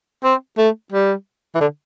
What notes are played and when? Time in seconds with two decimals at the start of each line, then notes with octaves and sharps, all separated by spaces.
0.24 C4
0.58 A3
0.92 G3
1.55 E3
1.61 D3